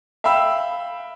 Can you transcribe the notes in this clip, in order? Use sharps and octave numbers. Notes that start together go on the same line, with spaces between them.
E5 F5 G5 B5 E6